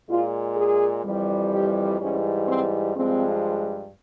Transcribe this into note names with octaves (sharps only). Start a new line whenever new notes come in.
A#2 G#3 F4
G#4
F2 E3 G3
G4
G#2 E3 G3 C#4
C4
G2 F3 G#3 C4